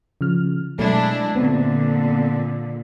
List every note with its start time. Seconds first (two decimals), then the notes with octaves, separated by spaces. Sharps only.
0.21 C#3 F3 F6
0.79 B2 F#3 G#3 A3 D4 E4
1.35 A#2 D3 B3 C4